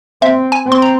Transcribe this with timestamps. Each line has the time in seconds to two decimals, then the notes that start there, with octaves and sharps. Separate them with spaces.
0.22 C4 E5
0.52 G#5
0.68 C4 C6
0.82 A#5